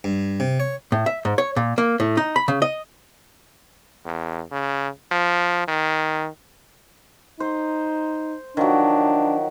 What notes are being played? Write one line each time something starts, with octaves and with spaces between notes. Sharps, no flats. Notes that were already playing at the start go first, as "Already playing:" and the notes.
G2
C3
C#5
A2
E5
G#2
C#5
A#2
A#3
A2
D#4
B5
C#3
D#5
E2
C#3
F3
D#3
D#4 C5
D#3 F3 F#3 D4